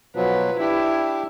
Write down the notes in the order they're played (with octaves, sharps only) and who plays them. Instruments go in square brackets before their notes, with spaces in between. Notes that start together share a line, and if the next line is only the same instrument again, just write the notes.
[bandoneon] B2 F3 F#3 [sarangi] B4
[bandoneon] D4 G4 [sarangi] E4